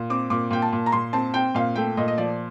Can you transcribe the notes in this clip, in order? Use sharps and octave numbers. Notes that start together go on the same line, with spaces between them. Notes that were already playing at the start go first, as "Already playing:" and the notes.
Already playing: A#2
C4 D6
A#2 D6
A#2 G5
A5
A#2
A#5
A#2 C6
C4 A5
C4 G5
A#2 F5
A3 G5
A#2 D#5
D#5
F3 D5